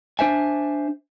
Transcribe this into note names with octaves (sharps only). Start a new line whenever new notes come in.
D4 C5 E5 G#5